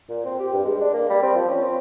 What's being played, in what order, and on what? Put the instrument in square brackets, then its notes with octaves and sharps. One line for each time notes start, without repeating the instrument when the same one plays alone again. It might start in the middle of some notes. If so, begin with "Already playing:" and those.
[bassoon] A#2
C4
G4
G2
G#3
D4
A#3
G3
C4
F3
C#4
C4